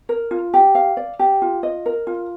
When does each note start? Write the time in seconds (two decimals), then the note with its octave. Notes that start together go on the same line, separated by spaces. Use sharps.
0.09 A#4
0.31 F4
0.54 G4
0.75 F5
0.97 D5
1.19 G4
1.42 F4
1.63 D#5
1.86 A#4
2.07 F4